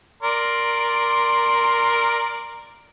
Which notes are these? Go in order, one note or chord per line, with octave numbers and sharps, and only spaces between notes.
A#4 D5 C6